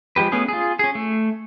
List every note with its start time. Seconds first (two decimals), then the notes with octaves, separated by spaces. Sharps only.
0.16 F3 G#3 G4 B4
0.32 A3 B3 C#4 G#4
0.48 F4 G#4
0.79 C#4 G#4
0.95 A3